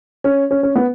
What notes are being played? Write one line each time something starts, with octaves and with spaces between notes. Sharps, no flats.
C#4
C#4
C#4
B3